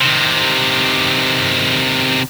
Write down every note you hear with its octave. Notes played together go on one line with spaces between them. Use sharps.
C3 D#3